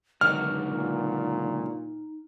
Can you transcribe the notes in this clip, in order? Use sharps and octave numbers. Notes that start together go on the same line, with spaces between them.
C#2 D3 D#3 F#3 D#4 F6
A#2